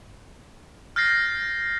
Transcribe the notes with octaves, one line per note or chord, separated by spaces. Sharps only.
F6 G6 A6 A#6 C7